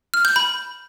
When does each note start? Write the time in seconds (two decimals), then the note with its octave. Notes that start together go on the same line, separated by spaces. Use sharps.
0.14 F6
0.25 G6
0.36 B5